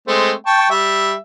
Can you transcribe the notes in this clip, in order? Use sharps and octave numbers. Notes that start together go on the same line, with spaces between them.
G#3 A3 C4
G5 A5 C#6
G3 E5